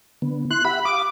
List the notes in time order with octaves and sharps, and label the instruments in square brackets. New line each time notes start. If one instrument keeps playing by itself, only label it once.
[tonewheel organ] D3 B3
[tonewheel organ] E4 C6 [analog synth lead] F#6
[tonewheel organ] G4 E5 F#5 [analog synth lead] B5
[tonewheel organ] G4 F5 D#6 [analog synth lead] D6